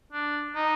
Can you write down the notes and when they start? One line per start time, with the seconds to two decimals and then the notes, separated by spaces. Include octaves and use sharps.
0.13 D4
0.56 D#4